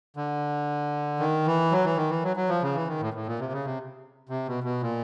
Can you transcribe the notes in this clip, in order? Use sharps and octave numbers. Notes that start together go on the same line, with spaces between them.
D3
D#3
E3
F#3
E3
D#3
E3
F#3
F#3
F3
C#3
E3
D#3
A2
A2
A#2
C3
C#3
C3
C3
B2
B2
A#2